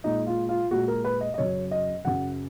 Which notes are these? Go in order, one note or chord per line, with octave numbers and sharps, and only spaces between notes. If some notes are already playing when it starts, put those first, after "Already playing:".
A#2 G#3 D#4
F4
F4
A#2 G#3 F#4
A#4
B4
D#5
D#5
F#2 C#3 F#3 C#5
D#5
F#2 C#3 F#3 F#5